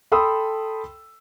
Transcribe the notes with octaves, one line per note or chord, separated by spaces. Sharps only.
A4 G5 B5 C6 D#6 E6